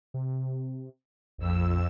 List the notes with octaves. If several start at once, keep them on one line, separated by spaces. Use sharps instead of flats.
C3
A#1 F2 E6